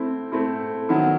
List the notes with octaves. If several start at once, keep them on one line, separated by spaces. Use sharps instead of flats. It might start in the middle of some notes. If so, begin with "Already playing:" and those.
Already playing: A3 C4 E4
A3 C4 E4
D#3 F#3 B3 E4